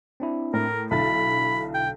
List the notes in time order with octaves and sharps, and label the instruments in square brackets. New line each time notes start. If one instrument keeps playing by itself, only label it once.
[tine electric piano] C4 D4 E4
[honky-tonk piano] A2 [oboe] A#4
[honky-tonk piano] B1 D3 A6 [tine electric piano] E4 [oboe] B5
[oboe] G5